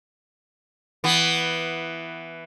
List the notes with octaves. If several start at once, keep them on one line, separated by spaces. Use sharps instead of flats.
E3 B3